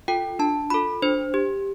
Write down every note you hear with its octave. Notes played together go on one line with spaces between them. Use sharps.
F4 A4 G5
D4 A5
F4 A4 B5
D4 C5
G4